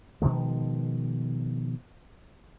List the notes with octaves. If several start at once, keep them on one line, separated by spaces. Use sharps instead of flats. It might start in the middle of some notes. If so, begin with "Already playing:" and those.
B2 D#3 F3 G#3